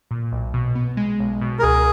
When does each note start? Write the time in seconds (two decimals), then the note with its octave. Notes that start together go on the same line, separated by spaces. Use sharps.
0.11 A#2
0.32 B1
0.54 B2
0.75 B3
0.97 G#3
1.19 B1
1.41 B2
1.59 A#4
1.62 C#2 G#4